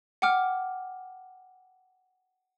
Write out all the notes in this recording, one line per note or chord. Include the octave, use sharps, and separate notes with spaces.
F#5 G5 D6 F6